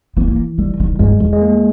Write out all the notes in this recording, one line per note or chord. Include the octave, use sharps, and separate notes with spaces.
E3 B3
A#3
D#3 G3
D#3
G2 G#3
E2
G#3
A#3